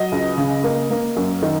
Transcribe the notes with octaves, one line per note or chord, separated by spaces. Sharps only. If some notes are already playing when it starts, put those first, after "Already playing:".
Already playing: F#3 D#5
C#2
C#3
A#3
A#3
F#2
D#3